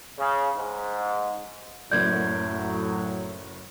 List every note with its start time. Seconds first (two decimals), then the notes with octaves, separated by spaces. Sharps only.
0.19 C#3
0.57 G#2
1.91 F#1 F#2 A2 F#3 D5 G6 G#6